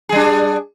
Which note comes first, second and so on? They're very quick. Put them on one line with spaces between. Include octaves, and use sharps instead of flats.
G#4 G3 D4